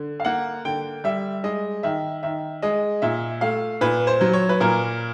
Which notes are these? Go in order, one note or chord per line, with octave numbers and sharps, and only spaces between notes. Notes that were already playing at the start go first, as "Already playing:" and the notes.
Already playing: D3
F5
A#3 F#5
D3 G5
G3 E5
G#3 D#5
D#3 E5
D#3 E5
G#3 D#5
A#2 E5
A3 F5
A#2 B4
C5
F#3
C#5
B4
A#2 A#4